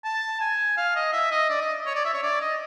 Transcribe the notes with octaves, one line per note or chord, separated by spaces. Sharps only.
A5
G#5
F5
D#5
E5
D#5
D5
D#5
C#5
D5
E5
C#5
D5
D#5